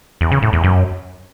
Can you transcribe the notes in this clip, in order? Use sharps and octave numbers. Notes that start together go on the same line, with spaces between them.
E2
C#3
A2
E2
F#2